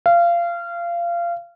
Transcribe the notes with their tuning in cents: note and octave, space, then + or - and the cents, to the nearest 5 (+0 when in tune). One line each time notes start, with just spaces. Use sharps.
F5 -25